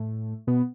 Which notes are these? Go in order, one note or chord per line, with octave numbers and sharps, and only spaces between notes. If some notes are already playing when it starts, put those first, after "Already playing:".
Already playing: A2 A3
B2 B3